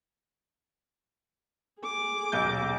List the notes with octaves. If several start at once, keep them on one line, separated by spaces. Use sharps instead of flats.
G#4 D6
D#1 B1 G6